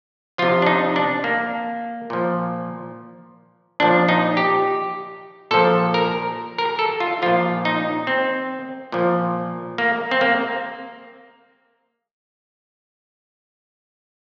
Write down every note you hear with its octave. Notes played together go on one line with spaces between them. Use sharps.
C3 F3 F4
D4
D#4
D4
A#3
A#2 F3
A#2 F3 D4
D#4
G4
A#2 F3 A4
A#4
A#4
A4
F4
A#2 F3 F4
D#4
C4
A#2 F3
A#3
C4
A#3